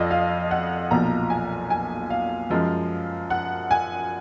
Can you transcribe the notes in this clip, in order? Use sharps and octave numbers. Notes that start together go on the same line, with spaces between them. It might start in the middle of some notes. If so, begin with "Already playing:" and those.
Already playing: F2 F3 D5 D#5
F5
F#5
B1 A#2 F3 A#5
G#5
G#5
F5
F#2 F3 G#3
F#5
G#5